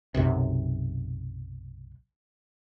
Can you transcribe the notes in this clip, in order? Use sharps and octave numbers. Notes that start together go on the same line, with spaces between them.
B1 F#2 C3